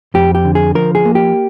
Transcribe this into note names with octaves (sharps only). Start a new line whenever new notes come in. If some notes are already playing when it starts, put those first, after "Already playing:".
F2 G4
G4
D3
G#4
F3 A#4
G#4
A#3
G4